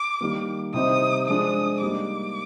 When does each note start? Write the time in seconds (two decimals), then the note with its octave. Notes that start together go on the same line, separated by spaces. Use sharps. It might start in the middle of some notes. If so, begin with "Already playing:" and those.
Already playing: D6
0.21 D#3 G3 A#3
0.74 C3 G3 C4 D#4 D#6
1.27 F3 G#3 D4 F4 D#6
1.81 G3 A#3 D#4 D6